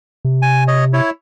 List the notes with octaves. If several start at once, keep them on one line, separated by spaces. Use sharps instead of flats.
C3
G#5
C#5 D#5
E4 C#5